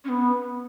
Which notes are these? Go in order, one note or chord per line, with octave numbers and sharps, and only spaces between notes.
C#4
B3